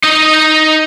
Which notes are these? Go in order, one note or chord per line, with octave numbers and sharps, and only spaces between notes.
D#4 D#5